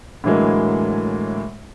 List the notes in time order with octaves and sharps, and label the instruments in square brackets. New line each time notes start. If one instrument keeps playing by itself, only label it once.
[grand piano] A2 D3 E3 F#3 G#3 A#3